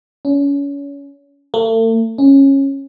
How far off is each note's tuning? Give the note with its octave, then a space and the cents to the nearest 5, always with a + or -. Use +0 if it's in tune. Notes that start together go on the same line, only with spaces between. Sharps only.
C#4 +30
A3 +40
C#4 -15